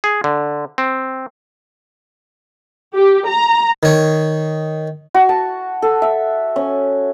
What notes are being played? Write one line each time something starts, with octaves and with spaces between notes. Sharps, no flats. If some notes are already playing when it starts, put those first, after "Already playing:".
G#4
D3
C4
G4
A#5
D#3 C#5
F#4
A5
A4
E5
C#4